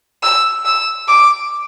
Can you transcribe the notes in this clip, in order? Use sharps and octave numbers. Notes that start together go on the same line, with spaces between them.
E6
E6
D6